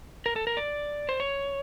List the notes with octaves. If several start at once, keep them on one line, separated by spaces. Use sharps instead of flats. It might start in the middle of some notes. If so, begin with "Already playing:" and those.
A#4
A4
A#4
D5
C5
C#5